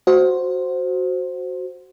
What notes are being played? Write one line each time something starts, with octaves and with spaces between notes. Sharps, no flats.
F#4 C5